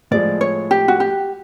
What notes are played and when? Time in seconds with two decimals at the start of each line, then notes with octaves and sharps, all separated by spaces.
0.11 A2 F3 G#3 D5
0.41 C#5
0.71 G4
0.88 F#4
1.00 G4